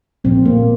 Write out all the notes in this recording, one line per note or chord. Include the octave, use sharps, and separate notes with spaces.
A#2 F3 A#3 C4
A#3